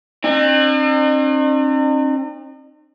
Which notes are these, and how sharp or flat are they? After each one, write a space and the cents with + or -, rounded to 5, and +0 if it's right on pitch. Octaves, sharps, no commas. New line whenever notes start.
C4 +40 D#4 -45